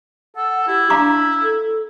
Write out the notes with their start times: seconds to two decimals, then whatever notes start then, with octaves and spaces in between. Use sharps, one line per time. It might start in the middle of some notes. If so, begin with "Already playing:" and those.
0.36 A4 F#5
0.67 E4 G4
0.90 D4 F5 A#5 D6
1.42 A4